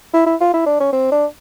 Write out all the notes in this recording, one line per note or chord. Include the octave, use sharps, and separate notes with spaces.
E4
E4
F4
E4
D4
C#4
C4
D4